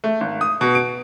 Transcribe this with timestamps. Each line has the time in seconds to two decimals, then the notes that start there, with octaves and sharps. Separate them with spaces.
0.04 A3
0.21 G#1
0.41 D#6
0.61 B2
0.75 D7